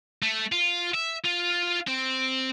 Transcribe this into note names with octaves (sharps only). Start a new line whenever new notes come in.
A3
F4
E5
F4
C4